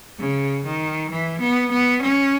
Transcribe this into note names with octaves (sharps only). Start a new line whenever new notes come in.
C#3
D#3
E3
B3
B3
C#4